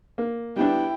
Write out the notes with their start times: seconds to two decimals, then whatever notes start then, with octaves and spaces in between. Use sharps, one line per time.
0.18 A#3
0.56 G3 B3 D4 E4 G5